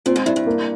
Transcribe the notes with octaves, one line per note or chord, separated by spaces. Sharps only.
A#2 C4
G#2
G2 E4
G2
A#3